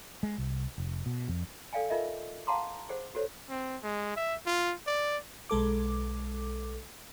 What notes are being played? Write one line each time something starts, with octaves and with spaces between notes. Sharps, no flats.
G#3
C2
F1
B2
F2
A4 D5 F5 G5 G#5
D#4 F4 A4 A#4 D#5 E5
F5 F#5 A5 A#5 C6 D6
G4 G#4 C5 F#5
F#4 A4 C5 C#5
C4
G#3
E5
F4
D5
B1 G#3 A4 D6